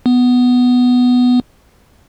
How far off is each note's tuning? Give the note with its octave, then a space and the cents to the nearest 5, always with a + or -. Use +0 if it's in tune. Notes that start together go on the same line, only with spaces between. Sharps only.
B3 +5